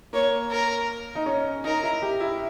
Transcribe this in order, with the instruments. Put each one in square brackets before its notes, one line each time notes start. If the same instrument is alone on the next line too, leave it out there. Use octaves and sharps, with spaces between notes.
[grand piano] A#3 [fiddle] C#5
[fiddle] A#4
[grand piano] D#4
C#4
[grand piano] D#4 [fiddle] A#4
[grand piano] E4
G4
E4